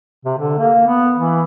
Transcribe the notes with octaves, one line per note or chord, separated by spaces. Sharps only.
C3
D3
A#3
B3
E3